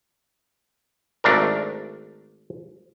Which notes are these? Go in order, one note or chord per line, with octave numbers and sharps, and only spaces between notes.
G#1 A3 D4 A#4